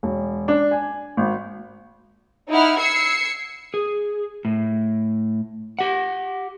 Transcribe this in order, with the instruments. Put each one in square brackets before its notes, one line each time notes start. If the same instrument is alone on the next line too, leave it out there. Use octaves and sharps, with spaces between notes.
[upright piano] E1
D4
G#5
G#1
[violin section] D#4 E4 F#5 F6
E6 G#6 C7 C#7
[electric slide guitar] G#4
A2
G4 F#5